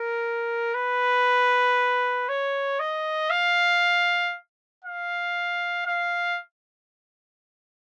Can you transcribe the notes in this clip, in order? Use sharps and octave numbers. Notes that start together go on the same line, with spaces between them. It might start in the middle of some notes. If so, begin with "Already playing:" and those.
Already playing: A#4
B4
C#5
D#5
F5
F5
F5